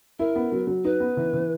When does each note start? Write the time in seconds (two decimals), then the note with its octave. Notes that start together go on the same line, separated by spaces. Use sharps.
0.19 E4 A#4
0.36 B3
0.52 F#3
0.67 F#3
0.84 D#4 B4
1.00 B3
1.17 E3
1.33 E3